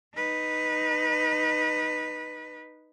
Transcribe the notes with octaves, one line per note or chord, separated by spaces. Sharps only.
D#4 B4